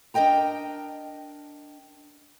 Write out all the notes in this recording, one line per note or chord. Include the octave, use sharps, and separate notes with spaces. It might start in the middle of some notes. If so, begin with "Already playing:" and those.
D4 A#4 D#5 G5 A#5